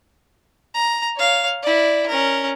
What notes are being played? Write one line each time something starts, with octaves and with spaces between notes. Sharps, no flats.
A#5
C#5 F5
E4 D5
C#4 A#4